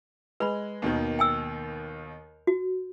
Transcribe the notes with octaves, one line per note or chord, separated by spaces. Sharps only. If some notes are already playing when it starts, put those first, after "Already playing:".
G#3 B4 B5
D#2 B2 D#3
G5 G#5 E6
F#4